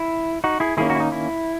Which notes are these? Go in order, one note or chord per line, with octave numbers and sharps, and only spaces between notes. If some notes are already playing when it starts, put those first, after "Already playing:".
Already playing: E4
D#4 F#4
E4 G#4
D#3 A#3 C#4 E4 G#4
D#4 F#4
E4
D#4
E4